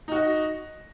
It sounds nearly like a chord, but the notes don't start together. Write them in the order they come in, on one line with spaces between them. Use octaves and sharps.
D#4 F#4 D#5